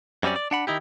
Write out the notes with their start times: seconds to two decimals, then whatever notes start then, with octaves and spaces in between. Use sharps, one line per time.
0.23 F#2 G3 C4 C#4 D5
0.36 D5
0.51 D4 F#5 B5
0.67 D#3 D#4 E4 G4